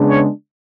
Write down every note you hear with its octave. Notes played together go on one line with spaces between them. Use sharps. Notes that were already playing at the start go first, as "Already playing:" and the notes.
Already playing: C#3 G#3 B3 D4
C#5